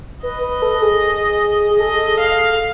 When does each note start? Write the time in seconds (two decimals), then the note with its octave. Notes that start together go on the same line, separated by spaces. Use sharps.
0.23 B4 D#5
0.43 B4
0.62 A4
0.75 A4
0.82 G#4
1.70 G#4
1.80 A4 D#5
2.19 F5